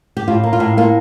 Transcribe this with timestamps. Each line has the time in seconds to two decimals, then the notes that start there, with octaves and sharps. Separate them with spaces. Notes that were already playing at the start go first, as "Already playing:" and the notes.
0.17 G4
0.28 A2 F4
0.43 A#3
0.53 F4
0.60 A2
0.77 A#3 F4